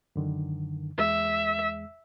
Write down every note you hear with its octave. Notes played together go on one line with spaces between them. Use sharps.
F#2 D3 D#3
E2 G#3 E5 E6